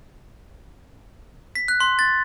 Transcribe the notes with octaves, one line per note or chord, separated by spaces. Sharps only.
B6
F#6
C6
A6